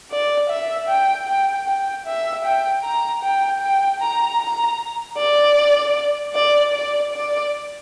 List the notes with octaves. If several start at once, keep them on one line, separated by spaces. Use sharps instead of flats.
D5
E5
G5
G5
G5
E5
G5
A#5
G5
G5
A#5
A#5
D5
D5
D5
D5